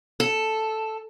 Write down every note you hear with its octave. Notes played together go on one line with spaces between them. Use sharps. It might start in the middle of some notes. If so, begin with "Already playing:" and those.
A4